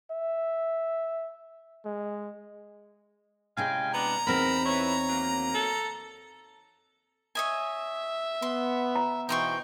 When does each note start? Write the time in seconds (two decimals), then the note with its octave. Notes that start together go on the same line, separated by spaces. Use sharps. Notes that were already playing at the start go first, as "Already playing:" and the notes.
0.11 E5
1.85 G#3
3.57 C3 G#3 C#4 E4 F5 G5 G#5
3.94 B3 D4 A#5
4.27 E2 C4 D#4 A#4 B5
4.65 E4 B4 C#5
5.09 D#3 F#3 A#3
5.54 A4
7.35 C#5 D#5 E5 G#5
8.42 B3 C6
8.96 A#5
9.29 B2 E3 D#4 C5 G5 C6 C#6